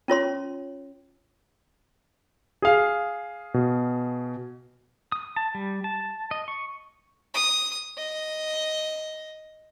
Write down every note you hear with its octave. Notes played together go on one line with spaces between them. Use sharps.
C#4 F4 C#5 C6
G#4 F5
B2
D#6
A5
G3
A5
D#5
C#6
D#6
D#5